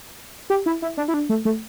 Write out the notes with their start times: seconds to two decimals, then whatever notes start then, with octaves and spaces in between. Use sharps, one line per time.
0.50 G4
0.66 E4
0.82 E4
0.97 D4
1.08 E4
1.14 D4
1.29 A3
1.45 A3